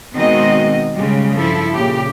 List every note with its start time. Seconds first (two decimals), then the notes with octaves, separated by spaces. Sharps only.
0.15 B2 D#3 G#3 C4 F#4 D#5
0.95 G#2 C#3 G3 G#3
1.36 G2 F3 E4 A4
1.73 A#2 C#3 G4